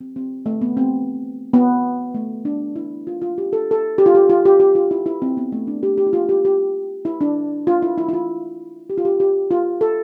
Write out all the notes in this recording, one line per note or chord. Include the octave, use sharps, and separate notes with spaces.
C4
C4
A3
B3
C4
B3
A3
D4
E4
F4
F4
G4
A4
A4
G4
F4
G4
F4
G4
G4
F4
E4
E4
C4
B3
A3
D4
G4
G4
E4
F4
G4
G4
E4
D4
F4
E4
E4
E4
F4
G4
F4
G4
G4
F4
A4